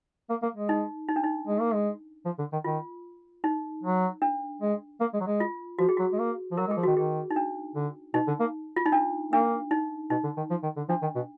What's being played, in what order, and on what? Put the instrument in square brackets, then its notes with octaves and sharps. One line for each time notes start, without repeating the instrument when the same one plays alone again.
[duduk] A#3
A#3
G#3
[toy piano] D#4
D#4
D4
D#4
[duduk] G#3
A#3
G#3
F3
D3
D#3
[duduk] D#3 [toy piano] F4
[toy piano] D#4
[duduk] F#3
[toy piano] D4
[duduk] G#3
A#3
G#3
F#3
G#3
[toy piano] F4
[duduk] F3 [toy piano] F#4
[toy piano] G#4
[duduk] F#3 [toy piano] F#4
[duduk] G#3
A#3
F3
[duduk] F#3 [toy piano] A#4
[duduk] G#3
[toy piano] G#4
[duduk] F3
[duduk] D#3 [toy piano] F#4
[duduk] D#3 [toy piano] G#4
[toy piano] D#4
D4
[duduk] D3
[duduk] B2 [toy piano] D#4
[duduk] D3
A#3
[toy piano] F4
D#4
D4
[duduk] A#3 [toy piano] D4
[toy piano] D#4
[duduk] B2 [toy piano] D#4
[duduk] D3
D#3
F3
D#3
D3
[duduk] F3 [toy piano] D4
[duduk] D#3
B2